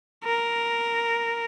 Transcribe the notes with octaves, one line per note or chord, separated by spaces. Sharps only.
A#4